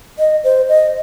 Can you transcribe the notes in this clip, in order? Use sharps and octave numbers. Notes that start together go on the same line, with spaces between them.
D#5
C5
D#5